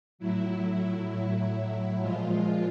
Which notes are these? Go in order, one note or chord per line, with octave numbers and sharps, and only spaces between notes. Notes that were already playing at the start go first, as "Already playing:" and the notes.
A2 F#3 E4
A#2 F3 G#3 F4